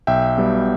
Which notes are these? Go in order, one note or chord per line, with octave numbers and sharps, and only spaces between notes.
B1 E5 G5
B2 G3 B3